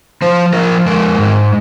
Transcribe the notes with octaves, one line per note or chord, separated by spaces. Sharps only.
F3 C5
F3 A#4
G#3 A#4
G#2